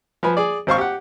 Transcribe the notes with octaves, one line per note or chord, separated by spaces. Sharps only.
F3 B4 G#5 B5
G#4 D5
G#1 C5 F5 C#6
G4 F#5